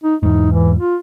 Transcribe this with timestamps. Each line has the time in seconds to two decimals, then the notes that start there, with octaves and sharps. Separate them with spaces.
0.04 D#4
0.23 E2 G#2 D#4
0.52 E3
0.79 F4